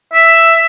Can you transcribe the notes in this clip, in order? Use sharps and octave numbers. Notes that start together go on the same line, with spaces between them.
E5